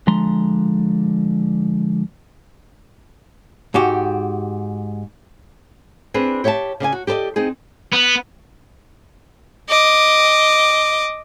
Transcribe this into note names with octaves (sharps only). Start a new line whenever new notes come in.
D3 F3 G#3 A#5 C6
G#2 F#4 G4
C4 D4 G#4 B4
G4 C#5 E5 G5 A5
C#3 D5 F5 G#5
F#4
G4 A4 B4 D5 D#5
C4 D#4 G#4
B3
D#5 D6